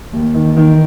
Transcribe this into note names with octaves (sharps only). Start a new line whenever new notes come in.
D#2
D#3
D#3